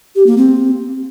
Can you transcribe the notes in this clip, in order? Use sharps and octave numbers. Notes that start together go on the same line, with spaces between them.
G4
A#3
C4